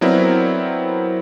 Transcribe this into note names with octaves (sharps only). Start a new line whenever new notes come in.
F#3 B3 C4 E4 A#4 D5